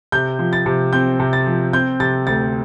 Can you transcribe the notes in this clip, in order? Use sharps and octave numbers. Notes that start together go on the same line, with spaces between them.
C3 G6
F3
A6
C3
C4 G6
C3
A6
F3
C4 G6
C3 A6
D2 A6